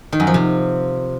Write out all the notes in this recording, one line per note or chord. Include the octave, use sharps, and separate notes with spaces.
D#3
F#2
F3
C3